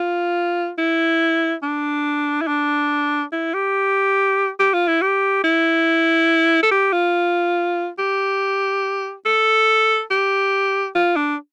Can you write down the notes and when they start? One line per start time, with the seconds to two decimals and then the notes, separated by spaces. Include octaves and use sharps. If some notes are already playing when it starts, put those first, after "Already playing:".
Already playing: F4
0.78 E4
1.62 D4
2.41 E4
2.47 D4
3.32 E4
3.54 G4
4.60 G4
4.74 F4
4.88 E4
5.02 G4
5.44 E4
6.63 A4
6.71 G4
6.93 F4
7.99 G4
9.26 A4
10.11 G4
10.95 F4
11.17 D4